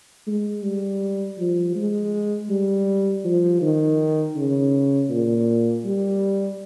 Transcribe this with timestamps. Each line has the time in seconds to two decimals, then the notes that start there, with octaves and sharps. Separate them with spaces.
0.27 G#3
0.64 G3
1.38 F3
1.75 G#3
2.50 G3
3.25 F3
3.61 D#3
4.36 C#3
5.10 A#2
5.85 G3